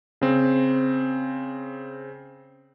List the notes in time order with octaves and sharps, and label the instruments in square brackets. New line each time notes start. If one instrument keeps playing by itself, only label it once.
[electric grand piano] C#3 C4